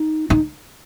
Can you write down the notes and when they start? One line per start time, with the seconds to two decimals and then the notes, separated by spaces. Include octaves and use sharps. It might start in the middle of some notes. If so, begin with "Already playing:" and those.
Already playing: D#4
0.30 D#4